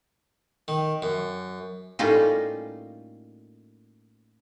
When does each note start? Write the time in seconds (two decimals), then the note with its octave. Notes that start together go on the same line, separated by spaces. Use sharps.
0.68 D#3
1.02 F#2
1.99 A2 G3 A#3 C#4 D#4 F4